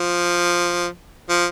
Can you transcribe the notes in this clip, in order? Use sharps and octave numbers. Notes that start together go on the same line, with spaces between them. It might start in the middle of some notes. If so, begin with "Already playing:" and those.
Already playing: F3
F3